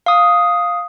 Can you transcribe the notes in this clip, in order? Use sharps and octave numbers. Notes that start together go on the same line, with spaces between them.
F5 D#6